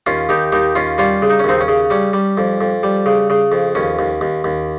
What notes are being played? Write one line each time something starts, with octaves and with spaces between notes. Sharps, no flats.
D#2 C#4 F4
D#2 D#4 G4
D#2 D#4 G4
D#2 C#4 F4
G3 C#4 F4
C#3
D#4
C#4
D#2 C4 D#4
C#4
C#3
G3 C#4
G3
F2
F2
G3
C#3
C#3
F2
D#2 C#4
D#2
D#2
D#2